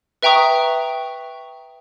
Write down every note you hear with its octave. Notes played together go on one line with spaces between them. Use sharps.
B4 E5 G5 A#5 C#6 D#6